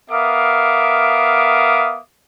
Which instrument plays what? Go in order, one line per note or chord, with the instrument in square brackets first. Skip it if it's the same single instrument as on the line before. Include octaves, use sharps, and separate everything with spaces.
[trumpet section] B3 A#4 E5 F5 D6 D#6